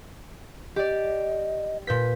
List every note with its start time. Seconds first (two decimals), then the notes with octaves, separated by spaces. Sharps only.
0.76 G4 D5 D#5
1.87 A#2 B4 G6 B6